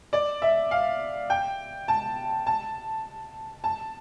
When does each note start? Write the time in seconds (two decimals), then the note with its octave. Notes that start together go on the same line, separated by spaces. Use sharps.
0.13 D5
0.42 E5
0.71 F5
1.30 G5
1.88 A5
2.47 A5
3.64 A5